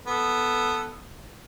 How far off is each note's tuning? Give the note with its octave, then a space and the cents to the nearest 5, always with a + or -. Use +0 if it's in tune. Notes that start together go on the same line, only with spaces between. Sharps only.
B3 +0 A4 +0